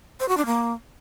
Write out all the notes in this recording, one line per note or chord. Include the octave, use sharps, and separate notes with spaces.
C5
F#4
D4
A#3